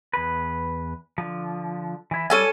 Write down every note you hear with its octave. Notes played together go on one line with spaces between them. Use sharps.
E2 B4
D3 F3
E3 E4
G3 C#4 A4 G#5